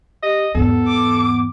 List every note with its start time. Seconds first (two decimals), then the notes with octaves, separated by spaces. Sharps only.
0.23 G4 D#5
0.55 E2 G#2 B3 A4
0.88 D6